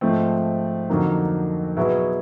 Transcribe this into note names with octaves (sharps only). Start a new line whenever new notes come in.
G#2 F3 A3 C4
F2 D3 F#3 A#3 D#4
B2 F#3 B3 E4 G#4